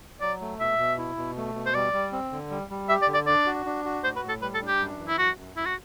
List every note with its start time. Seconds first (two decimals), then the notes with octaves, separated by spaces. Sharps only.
0.21 F#3 D5
0.41 A3
0.60 B2 E5
0.78 B2
0.98 E4
1.17 B2
1.37 A3
1.55 B2
1.66 C5
1.75 G3 D5
1.93 G3
2.12 C4
2.32 D3
2.50 G3
2.71 G3
2.89 G4 E5
3.02 D5
3.08 D3
3.14 D5
3.27 D4 D5
3.46 F#4
3.66 D4
3.85 F#4
4.03 A2 C5
4.16 B4
4.23 A2
4.29 A4
4.41 G3 B4
4.54 A4
4.62 D4
4.67 G4
4.80 F#2
4.99 E3
5.08 E4
5.18 F#2 F#4
5.37 F#2
5.56 F#2 E4
5.66 F#4